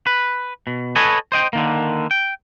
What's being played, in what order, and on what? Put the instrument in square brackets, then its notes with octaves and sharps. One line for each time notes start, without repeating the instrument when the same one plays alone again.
[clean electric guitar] B4
B2
A4 B4 C#5 D#5 G#5
C5 D#5 G5
D3 D#3 A#3
G5